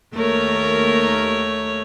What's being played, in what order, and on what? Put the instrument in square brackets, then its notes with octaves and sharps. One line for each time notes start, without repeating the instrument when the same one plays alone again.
[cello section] D#2 A#4 [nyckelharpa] A3 C#5